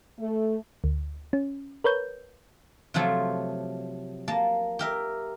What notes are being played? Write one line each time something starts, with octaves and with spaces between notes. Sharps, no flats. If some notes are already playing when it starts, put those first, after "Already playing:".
A3
D2
C#4
A#4 B4 C#5 G6
C3 F3 F#3 A3 C5
A#3 A5
G4 A#4 E5